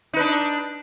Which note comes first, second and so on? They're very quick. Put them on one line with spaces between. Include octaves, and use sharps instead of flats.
D#4 B4 D4